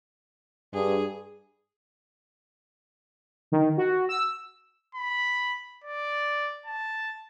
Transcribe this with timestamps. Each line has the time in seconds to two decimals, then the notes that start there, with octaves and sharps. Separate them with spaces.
0.74 G2 G#4
3.52 D#3
3.78 F#4
4.09 E6
4.95 B5
5.84 D5
6.66 A5